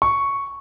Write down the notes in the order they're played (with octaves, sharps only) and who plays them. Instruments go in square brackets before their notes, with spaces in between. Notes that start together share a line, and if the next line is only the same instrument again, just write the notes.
[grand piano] C#6